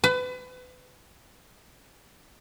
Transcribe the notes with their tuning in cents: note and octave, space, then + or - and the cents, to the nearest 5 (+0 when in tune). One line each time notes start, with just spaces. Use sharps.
B4 +30